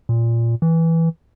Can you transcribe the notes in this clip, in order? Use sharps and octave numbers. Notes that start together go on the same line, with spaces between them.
A#2
E3